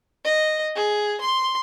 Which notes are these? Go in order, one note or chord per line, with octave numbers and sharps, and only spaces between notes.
D#5
G#4
C6